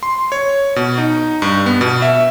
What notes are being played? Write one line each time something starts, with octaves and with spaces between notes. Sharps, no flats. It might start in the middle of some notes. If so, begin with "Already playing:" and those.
C6
C#5
B2
D#4
G2
B3
B2
E5